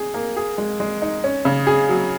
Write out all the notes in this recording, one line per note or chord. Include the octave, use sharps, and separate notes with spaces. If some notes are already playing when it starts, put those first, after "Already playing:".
Already playing: G#4
A#3
G#4
G#3
G#3
D#4
C#4
C#3
G#4
F#3